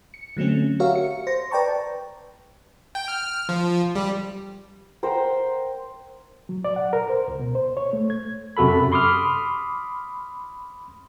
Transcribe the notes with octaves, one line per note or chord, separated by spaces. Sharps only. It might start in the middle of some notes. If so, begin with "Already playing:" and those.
C#7
D3 F#3 A3 C4 C#4
F#4 G4 A#4 C#5 E5 F5
C#7
C5 A#6
B4 D5 G5 A5 A#5 C#6
G5
F6
F3
G3
A#4 C5 F#5 G5
F#3
D5
F#5
A#4
C5
C#2
B2
C5
C#5
A3
G#6
F#2 C3 F#4 A4 B5
B5 C6 D6 D#6 F6